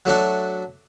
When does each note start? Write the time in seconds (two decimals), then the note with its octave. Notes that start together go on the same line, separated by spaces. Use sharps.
0.05 F#3 A3 D4 F#4